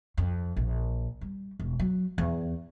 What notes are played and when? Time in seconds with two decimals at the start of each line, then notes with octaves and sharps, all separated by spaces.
0.17 F2
0.56 A#1
1.21 G3
1.59 E1
1.80 F#3
2.18 E2